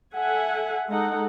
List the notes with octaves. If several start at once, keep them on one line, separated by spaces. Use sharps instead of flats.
A4 E5 F#5 G#5
G#3 D#4 A4 F#5